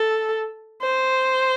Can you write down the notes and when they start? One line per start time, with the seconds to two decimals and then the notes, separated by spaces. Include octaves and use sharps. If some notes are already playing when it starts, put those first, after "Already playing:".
Already playing: A4
0.82 C5